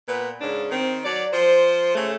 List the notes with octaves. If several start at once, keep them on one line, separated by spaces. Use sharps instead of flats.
A#2 B3 B4
G#2 C#3 D4
D#3 C4
F#3 D5
F3 C5
C#3 A3